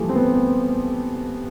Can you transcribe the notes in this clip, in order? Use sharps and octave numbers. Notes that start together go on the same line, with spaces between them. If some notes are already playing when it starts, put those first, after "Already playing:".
Already playing: E3 F3 G3 A3
C4
B3